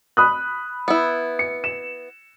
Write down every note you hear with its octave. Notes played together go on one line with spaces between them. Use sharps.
B5 D#6 F#6
B3 E4
C#7
E7